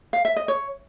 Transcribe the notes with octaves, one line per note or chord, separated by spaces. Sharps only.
F5
E5
D#5
C#5